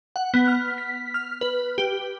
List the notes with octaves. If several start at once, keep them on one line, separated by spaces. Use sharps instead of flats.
F#5
B3
F6
B6
F6
B4
G4